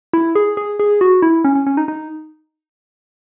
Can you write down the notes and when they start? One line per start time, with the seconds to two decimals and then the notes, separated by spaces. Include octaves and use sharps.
0.13 E4
0.35 G#4
0.57 G#4
0.80 G#4
1.01 F#4
1.22 E4
1.45 C#4
1.55 C#4
1.67 C#4
1.77 D#4
1.88 D#4